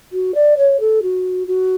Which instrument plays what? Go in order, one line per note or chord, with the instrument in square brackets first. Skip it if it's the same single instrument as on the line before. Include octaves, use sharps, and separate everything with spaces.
[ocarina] F#4
D5
C#5
A4
F#4
F#4